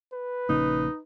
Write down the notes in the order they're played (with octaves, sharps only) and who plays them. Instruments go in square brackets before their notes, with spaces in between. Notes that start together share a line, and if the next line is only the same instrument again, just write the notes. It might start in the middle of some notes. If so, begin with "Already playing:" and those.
[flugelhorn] B4
[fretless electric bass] A#1 C#3 A#3 [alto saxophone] D#4